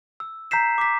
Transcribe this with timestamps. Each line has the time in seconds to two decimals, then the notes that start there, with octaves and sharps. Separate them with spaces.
0.20 E6
0.51 A#5 G6 B6 C7 E7
0.78 D6 B6